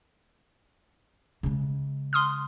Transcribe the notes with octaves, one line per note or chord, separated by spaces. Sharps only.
C#3 G#3
C6 D#6 F6